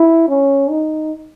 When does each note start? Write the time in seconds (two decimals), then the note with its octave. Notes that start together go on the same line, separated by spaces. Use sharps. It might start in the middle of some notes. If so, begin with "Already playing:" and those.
Already playing: E4
0.28 C#4
0.70 D#4